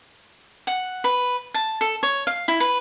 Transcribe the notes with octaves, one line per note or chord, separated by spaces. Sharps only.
F#5
B4
A5
A4
C#5
F5
E4
B4